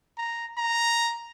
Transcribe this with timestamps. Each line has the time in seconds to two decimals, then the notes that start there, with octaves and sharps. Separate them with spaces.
0.17 A#5
0.58 A#5